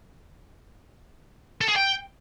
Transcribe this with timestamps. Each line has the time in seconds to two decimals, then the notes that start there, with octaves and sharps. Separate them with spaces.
1.61 A4
1.69 G#4
1.76 G5